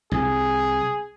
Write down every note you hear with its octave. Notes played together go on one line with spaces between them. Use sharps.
C2 G#4